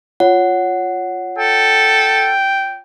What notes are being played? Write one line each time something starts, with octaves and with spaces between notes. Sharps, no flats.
F4 C#5 F#5
A4 G5